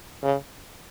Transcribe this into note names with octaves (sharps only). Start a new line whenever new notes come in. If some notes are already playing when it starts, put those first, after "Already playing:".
C#3